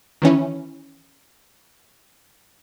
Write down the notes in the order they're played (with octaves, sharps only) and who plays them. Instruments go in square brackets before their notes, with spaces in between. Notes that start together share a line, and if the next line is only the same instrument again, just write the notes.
[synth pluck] D#3 E3 C#4 E4